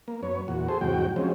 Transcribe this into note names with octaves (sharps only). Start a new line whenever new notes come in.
A#3
F#2 B3 C#5
E2 A#2 F#4
G#4 A4 C5
E2 G#2 C3 F#3 F#4 G5
F3 F#3 G#3 C4 C#4